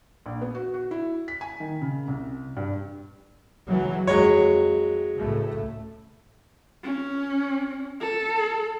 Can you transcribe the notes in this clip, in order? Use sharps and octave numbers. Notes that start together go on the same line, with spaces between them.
A#1
B3
F#4
F#4
E4
B6
G#5
D#3
C#3
C2
G2
C#2 E3 F#3
F2 F#3 G#3 C#5
C#2 A2 A3
C#4
A4